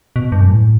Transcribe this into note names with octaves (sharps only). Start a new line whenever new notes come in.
B2
G2
F#2
A2